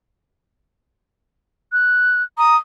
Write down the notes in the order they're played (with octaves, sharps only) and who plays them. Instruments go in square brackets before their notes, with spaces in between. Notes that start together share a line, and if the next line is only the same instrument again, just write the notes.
[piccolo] F#6
[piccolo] A#5 [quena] D#6